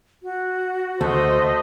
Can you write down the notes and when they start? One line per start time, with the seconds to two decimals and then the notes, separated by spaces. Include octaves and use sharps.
0.23 F#4
1.01 D2 A3 C5 D#5